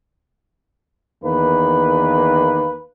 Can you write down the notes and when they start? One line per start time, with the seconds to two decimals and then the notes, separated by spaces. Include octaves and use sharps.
1.23 E2 D#3 A#3 B4